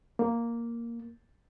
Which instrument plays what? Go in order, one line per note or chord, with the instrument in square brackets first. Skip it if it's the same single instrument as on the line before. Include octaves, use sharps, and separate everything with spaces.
[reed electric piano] A#3